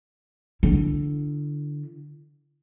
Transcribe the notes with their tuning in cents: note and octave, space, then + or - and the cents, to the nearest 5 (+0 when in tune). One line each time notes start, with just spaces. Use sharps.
D3 +0 E4 +45